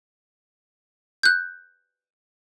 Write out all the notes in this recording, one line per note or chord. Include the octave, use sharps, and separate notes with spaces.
F#6 G6